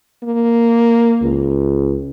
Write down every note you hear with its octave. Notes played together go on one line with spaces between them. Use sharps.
A#3
C#2